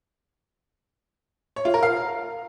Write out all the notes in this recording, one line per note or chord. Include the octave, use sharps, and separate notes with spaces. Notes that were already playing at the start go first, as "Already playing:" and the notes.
C#5
F4
A#4
F5